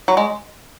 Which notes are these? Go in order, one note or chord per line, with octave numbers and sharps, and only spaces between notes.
F#3
G#3